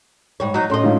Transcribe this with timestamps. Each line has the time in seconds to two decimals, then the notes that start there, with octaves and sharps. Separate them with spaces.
0.40 G#2 G3 C#5
0.54 F#3 D#4
0.70 A2 C#4 D#5 C6
0.83 G#2 C#4 F4